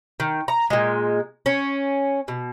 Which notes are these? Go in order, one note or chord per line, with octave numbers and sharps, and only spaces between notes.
D#3
A#5
A#2 G#3
C#4
B2